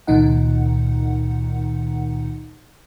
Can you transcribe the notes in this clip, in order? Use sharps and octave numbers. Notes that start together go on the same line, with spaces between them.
C#2 A#2 D#3 D#4 F#5